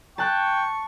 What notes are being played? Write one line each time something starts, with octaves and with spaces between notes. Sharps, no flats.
G5 A5 C#6 F#6